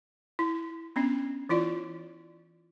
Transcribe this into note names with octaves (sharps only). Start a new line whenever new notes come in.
E4
B3 C#4 D4
E3 E4 F4 D5